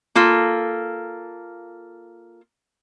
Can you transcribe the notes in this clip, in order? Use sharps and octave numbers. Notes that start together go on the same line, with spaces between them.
A#3 F4 A4